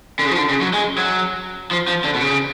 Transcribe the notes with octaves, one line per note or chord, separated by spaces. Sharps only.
D3
C#3
F3
D3
C#3
F#3
G#3
F#3
F3
F3
D3
B2
C#3